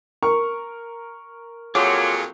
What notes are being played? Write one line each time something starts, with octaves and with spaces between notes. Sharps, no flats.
A#4 C#6
F2 A#2 F#3 F4 G#4 C#5 D6